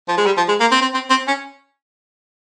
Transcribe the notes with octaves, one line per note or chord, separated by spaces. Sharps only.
F3
G#3
G3
F3
G#3
A#3
C4
C4
C4
C4
C#4